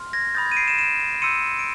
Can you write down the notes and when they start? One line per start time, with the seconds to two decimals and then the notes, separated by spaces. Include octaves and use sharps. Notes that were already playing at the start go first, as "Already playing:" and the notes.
Already playing: C6 F6
0.13 G#6 A#6
0.35 B5 D#6 G6 A6
0.46 G#6
0.52 D#7
0.57 C7 D7
0.68 D7 E7
0.78 D7 E7
1.22 C6 E6 G6 C#7 D#7
1.59 D7